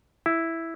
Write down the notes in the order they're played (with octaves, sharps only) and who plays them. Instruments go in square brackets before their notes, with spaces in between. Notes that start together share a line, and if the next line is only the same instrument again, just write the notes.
[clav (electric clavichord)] E4